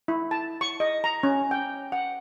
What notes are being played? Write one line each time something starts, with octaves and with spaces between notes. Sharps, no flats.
E4
A5
C#6
D#5
A#5
C#4
G5
F#5